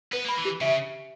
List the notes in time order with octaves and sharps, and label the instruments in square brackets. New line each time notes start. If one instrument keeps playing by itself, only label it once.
[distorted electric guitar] B3 [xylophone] B4
[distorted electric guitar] A#3 [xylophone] B5
[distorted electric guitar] E3
[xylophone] G4
[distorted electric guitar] C#3 [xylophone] E5